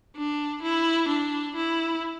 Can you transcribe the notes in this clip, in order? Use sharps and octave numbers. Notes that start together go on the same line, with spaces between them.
D4
E4
D4
E4